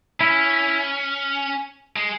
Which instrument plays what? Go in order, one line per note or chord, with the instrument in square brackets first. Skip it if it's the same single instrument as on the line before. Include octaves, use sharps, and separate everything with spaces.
[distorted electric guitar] C#4 [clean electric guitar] E4
[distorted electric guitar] G#3